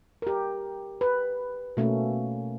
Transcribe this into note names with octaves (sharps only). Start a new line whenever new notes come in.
G4 A#4
B4
B2 A3 A#3 C#4